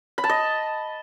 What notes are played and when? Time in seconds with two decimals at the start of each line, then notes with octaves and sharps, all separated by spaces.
0.18 B5
0.24 A5
0.29 D#5